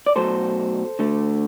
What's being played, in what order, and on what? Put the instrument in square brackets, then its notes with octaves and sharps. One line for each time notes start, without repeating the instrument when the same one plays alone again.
[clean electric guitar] D5
B2 F#3 A3 A4 C5
D3 A3